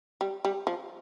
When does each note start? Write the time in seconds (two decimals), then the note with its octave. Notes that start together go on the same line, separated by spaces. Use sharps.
0.21 G3
0.45 G3
0.67 F3